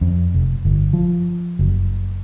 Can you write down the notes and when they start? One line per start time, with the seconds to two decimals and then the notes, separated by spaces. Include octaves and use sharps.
0.01 F2
0.34 F1
0.65 G1
0.93 F3
1.59 F#1